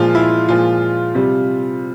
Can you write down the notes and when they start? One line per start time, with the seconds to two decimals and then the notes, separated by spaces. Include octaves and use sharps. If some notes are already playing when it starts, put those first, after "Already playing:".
Already playing: A#2 F3 G#3 F4
0.15 E4
0.48 A#2 F3 G#3 F4
1.15 C3 G3